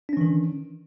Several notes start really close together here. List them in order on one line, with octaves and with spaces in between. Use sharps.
D4 C#4 E3 D#3